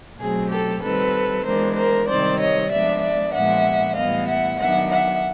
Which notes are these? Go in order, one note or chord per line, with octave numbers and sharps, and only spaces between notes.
B2 F#3 A3 C4 G#4
G4 A4
D#3 G3 C4 A4 B4
E3 G#3 B3 D4 A#4 C5
A#4 C5
C3 D#3 G3 C4 C5 D5
C#5 D#5
F3 G#3 B3 D4 D5 E5
D5 E5
A#2 F3 G#3 B3 D4 E5 F#5
A2 E3 G3 B3 D#5 F5
E5 F#5
D#3 F#3 B3 D4 E5 F#5
E5 F#5